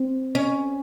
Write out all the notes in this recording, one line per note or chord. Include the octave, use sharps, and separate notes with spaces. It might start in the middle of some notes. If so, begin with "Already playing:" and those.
Already playing: C4
C#4